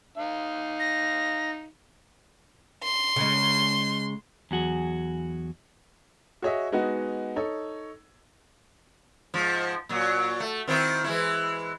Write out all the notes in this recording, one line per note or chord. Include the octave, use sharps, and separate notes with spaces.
D#4 F5
A#6
C6
C#3 G#3
E2 F#3 F#4 G#4
F#4 G#4 C#5 D#5 E5
G#3 B3 D#4 F#4 B4 F#5
D#4 A4 C#5
G#2 F3
A#2 F#3
A3
D#3 C4 E4
E3 G#3 E4